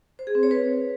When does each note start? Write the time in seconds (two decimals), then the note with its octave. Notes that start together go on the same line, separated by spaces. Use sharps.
0.19 C5
0.27 G#4
0.35 C4
0.43 C#5
0.51 B4